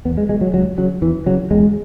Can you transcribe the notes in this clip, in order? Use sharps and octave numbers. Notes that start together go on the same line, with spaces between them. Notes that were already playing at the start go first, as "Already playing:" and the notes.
E2 B3
G#3
B2 G#3
F#3
C#2 F#3
C#3 F#3
E2 E3
C#3 F#3
E2 G#3